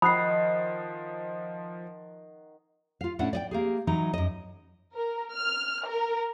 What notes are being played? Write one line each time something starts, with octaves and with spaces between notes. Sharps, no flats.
D#3 F3 F#5 B5 D#6 F#6 C7
F4 F5
A2 C#4 D4 E4 F#5
D5 D#5 G5
A#3 G4 G#4
E3 F#3 D#4
F#2 D#5
A#4
F6
A#4